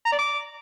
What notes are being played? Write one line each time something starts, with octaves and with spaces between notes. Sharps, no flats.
A#5
D5
D6